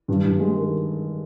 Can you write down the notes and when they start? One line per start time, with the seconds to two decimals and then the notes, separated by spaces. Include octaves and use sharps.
0.08 G2
0.24 G2
0.40 G#3
0.55 D#3